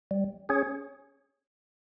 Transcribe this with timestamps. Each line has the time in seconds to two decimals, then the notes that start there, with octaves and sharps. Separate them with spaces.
0.11 G3
0.49 C#4 G#4 C#5